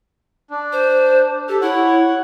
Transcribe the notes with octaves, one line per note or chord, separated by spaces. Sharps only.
D4
C5
G4 A4
E4 C#5 F#5